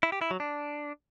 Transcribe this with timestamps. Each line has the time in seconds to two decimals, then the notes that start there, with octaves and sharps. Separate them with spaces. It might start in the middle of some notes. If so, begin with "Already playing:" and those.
0.03 E4
0.12 G4
0.21 E4
0.31 F#3
0.40 D4